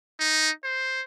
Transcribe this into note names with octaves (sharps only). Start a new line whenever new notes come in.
D#4
C5